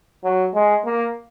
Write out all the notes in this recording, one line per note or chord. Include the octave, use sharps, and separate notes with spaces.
F#3
G#3
A#3